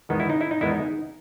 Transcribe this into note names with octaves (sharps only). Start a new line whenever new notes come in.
E2 D#3 G#3 B3 D#4
E4
D#4
E4
D#4
E2 D#3 G#3 B3 E4
D#4